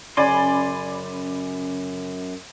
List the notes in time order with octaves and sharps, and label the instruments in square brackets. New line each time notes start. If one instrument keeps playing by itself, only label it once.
[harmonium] F#2 [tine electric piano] C#3 C#4 [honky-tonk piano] D5 B5 A6 [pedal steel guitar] G#5 C6